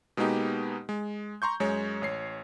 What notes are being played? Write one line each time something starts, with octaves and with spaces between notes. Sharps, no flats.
B2 G#3 A#3 B3 D#4 G4
G#3
A#5 C6 C#6 G6
F#2 G#3 C#5
A1 C#5 C7